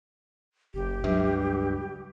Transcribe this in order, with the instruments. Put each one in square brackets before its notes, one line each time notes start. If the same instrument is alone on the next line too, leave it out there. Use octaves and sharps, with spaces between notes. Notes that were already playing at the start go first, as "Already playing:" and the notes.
[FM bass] F#1 [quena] G4
[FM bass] C#2 [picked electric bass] G2 [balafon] F#3